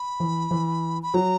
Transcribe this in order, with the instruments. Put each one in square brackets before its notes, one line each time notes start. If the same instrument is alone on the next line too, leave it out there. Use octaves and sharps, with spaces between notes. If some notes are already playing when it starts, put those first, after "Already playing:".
Already playing: [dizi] B5
[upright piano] E3
E3
[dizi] B5
[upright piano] F#3 [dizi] A#5